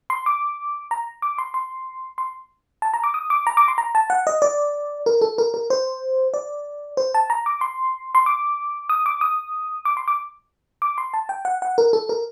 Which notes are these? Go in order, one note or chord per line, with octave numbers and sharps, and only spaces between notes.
C6
D6
A#5
D6
C6
C6
C6
A5
A#5
D6
D#6
D6
A#5
D6
C6
A#5
A5
F#5
D#5
D5
A#4
A4
A#4
A#4
C5
D5
C5
A5
A#5
D6
C6
C6
D6
D#6
D6
D#6
D6
C6
D6
D6
C6
A5
G5
F#5
F#5
A#4
A4
A#4